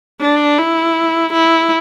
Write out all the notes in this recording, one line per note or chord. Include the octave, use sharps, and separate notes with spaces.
D4
E4
E4